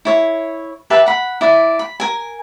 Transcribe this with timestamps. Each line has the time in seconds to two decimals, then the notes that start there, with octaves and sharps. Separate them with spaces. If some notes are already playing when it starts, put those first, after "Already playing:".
0.05 E4 C#5
0.90 G4 B4 E5 A5
1.06 F#5 B5
1.41 E4 D5
1.79 B5
2.00 A#4 G#5